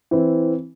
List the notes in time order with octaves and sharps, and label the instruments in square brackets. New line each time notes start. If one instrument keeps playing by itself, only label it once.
[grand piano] E3 C4 E4